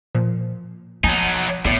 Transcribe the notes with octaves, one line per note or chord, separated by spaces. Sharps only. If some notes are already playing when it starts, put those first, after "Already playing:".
A#2 F3
F3 F#3 D#4 G#5 A5
A1 A2 B3 D5